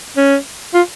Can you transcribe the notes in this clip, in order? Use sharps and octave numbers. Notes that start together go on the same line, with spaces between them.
C#4
F4